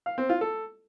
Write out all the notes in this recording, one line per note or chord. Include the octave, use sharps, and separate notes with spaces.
F5
C4
F4
A4